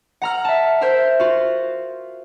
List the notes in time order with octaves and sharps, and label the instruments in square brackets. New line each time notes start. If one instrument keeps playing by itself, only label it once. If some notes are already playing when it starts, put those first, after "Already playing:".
[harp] F#5 A#5 F6
E5 A5
A#4 C5 E5 F6 G6
F4 F#4